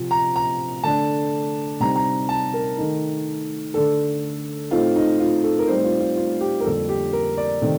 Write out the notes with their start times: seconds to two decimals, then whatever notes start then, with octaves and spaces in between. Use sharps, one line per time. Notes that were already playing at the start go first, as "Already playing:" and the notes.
Already playing: C3 F3 C4
0.11 A#5
0.36 A#5
0.84 D3 A3 D4 A5
1.80 C3 G3 C4 D#4 A#5
1.96 A#5
2.29 A5
2.54 A#4
2.77 D#3 A3 D#4
3.74 D3 A3 D4 A4
4.71 A2 A3 C4 D#4 F4
4.96 D#4
5.20 F4
5.44 A4
5.59 A#4
5.68 A2 G3 C4 D#4 C5
5.84 F4
6.00 F4
6.16 F4
6.41 G4
6.60 A#4
6.65 F2 D3 G3 A#3 A4
6.89 G4
7.13 A#4
7.37 D5
7.61 C3 D#3 A3